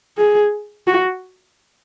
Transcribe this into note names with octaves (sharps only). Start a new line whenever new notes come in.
G#4
F#4